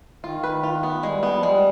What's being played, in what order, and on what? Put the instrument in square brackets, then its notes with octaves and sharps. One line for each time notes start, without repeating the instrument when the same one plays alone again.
[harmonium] D#3 [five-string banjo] F4
[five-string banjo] B4
F4
B3
[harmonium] G3 [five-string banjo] G#3
[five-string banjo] B3
[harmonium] F3
[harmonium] G3 [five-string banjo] G#3